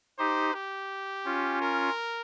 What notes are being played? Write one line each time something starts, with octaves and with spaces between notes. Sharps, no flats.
D#4 G4 C5
G4
C#4 F4
A#4